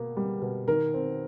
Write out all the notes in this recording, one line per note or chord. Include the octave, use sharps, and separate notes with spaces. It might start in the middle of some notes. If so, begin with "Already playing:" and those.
Already playing: B2 A#3
G3
B2
D#3 A#4
C4